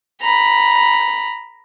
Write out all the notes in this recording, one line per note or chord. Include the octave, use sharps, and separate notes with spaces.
A#5 B5